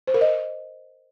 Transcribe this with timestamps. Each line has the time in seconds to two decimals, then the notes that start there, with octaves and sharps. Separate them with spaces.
0.07 C5
0.14 A#4
0.21 D#5